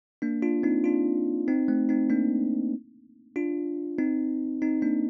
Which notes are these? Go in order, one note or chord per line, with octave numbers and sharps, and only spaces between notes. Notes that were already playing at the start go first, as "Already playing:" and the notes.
A#3 D4
D4 F4
C4 D#4
D4 F4
C4 D#4
A3 C4
C4 D#4
A#3 D4
D4 F4
C4 D#4
C4 D#4
A#3 D4